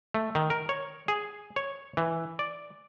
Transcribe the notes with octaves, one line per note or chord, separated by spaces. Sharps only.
A3
D#3
A#4
C#5
G#4
C#5
E3
D5